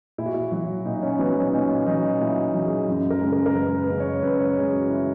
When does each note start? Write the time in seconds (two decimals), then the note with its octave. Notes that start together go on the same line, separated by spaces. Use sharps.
0.18 A#2 E4
0.26 F#4
0.34 E4
0.52 F#3 E4
0.85 A#2 D#4
1.03 C#4
1.19 F#3 B3
1.30 B3
1.36 C#4
1.47 C#4
1.53 A#2 D#4
1.86 F#3 D#4
2.20 A#2 E4
2.54 F#3
2.65 G#4
2.88 F#2
3.10 A#4
3.21 C#3 G#3
3.32 A#4
3.46 A#4
3.55 F#2 B4
3.77 B4
3.89 C#3 G#3
4.00 C#5
4.23 F#2 B4
4.39 C#5
4.56 C#3 G#3 G#4
4.73 F#4
4.90 E4